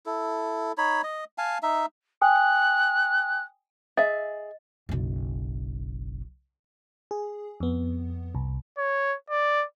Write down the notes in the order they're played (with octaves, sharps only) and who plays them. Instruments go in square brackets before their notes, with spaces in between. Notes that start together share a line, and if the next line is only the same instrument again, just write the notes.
[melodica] E4 A4
D#4 C#5 B5
D#5
F5 G#5 A5
D#4 E5
[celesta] G5 G#5 D#6 [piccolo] F#6
[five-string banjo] G#4 E5 [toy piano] D#5
[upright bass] F#1 B1
[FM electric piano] G#4
F2 B3
C2
[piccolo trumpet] C#5
D5